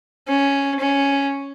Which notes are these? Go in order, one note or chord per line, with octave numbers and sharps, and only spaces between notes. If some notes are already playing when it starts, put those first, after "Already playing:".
C#4
C#4